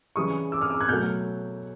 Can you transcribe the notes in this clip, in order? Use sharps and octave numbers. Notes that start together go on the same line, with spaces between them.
C#3 E3 G3 C#6 D#6
D6 E6
D#6 F6
D6 E6
F#6 G#6
B2 F#3 A3 F6 G6